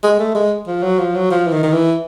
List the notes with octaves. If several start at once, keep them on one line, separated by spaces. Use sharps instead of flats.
G#3
A3
G#3
F3
F#3
F3
F#3
F3
E3
D#3
D#3
E3